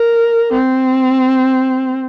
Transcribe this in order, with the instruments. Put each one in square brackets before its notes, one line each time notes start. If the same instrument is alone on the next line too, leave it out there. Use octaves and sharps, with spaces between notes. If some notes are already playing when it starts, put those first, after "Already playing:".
Already playing: [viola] A#4
C4